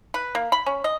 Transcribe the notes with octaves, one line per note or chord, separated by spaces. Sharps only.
B4
A#3
B5
C#4
D#5